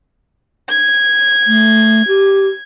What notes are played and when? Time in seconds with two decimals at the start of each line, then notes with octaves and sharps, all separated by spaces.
0.68 G#6
1.47 A3
2.08 G4